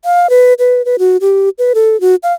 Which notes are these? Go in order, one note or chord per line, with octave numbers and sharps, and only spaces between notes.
F5
B4
B4
B4
F#4
G4
B4
A4
F#4
F5